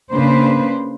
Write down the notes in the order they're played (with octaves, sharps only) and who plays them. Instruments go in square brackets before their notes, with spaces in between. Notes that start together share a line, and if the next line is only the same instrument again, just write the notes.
[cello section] C#3 A#3 D4 B4 C5